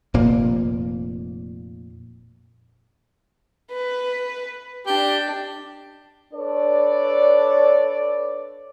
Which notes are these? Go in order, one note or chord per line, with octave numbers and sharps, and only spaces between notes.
F1 A#2 A#3
B4
D4 G4 D5
D4 A4 B4 C#5 D5